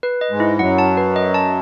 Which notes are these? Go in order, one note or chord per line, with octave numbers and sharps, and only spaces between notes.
B4
D#5
G#2 G#3
E4
F#2 F#3 F#5
A5
B4
D#5
A5